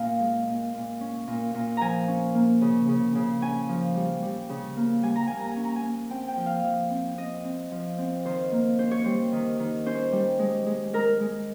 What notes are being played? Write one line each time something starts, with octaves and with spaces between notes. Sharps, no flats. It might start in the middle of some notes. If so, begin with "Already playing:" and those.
Already playing: A#2 C#4 F5
G#3
A#2
A#2
C#4
A#2
A#2
F3 G#5 A#5
C#4
A#3
C#3
C#3
C#3
C#4 G#5
F3
G3
G3
C#3
A#3
G3 G#5
A#5
A#3 G#5
A#5
C#4 G#5
A#5
G#5
A#3
C4 G5
G5
F3
F5
F3
C4
C4 D#5
C4
F3
C4
D#3 C5
A#3
C#4 C5
C#5
G3 C5
D#3
D#3
C#4 C5
G3
G#3
G#3
G#3 A#4
G#3